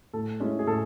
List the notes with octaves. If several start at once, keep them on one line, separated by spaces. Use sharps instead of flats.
A2 A4
G#3 C#4 E4
G#4
A2 A4